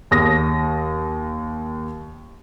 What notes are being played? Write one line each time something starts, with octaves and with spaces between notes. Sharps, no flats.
D#2 D#6 A#6